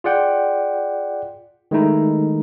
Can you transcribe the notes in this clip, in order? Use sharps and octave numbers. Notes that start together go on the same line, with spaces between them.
F4 G#4 D5 F#5 G5
D#3 G#3 A3 D#4 E4